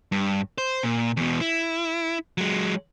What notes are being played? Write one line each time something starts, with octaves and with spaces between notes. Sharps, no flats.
G2
C5
A#2
E2 B2
E4
F#3 G#3